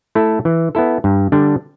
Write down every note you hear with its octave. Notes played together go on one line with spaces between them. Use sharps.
A3 E4 A4
E3
B3 E4 A4
G2
D3 G3 D4